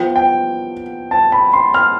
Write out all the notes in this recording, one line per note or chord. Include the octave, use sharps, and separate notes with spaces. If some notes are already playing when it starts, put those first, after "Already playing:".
Already playing: F3 B3 F4 G5
G5
A5
B5
C6
F6